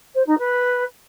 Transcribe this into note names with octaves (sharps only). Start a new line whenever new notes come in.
C5
D#4
B4